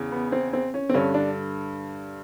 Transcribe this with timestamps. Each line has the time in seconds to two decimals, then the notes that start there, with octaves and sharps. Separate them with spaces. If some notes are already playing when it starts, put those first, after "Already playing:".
Already playing: E2 C#3
0.12 B3
0.32 C4
0.53 C4
0.74 C#4
0.89 C4
0.94 G2 D3 C#4
1.14 D4